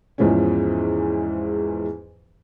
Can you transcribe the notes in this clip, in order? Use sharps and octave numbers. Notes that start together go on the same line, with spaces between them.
E2 G#2 E3 F3 G#3 C#4